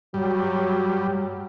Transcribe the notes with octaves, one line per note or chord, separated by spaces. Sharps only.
G2 F#3 G3